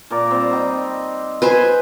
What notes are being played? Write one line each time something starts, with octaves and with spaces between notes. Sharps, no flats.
A#2 A#4 D5
G3 C4
D#4 G5
B4 C5 G#5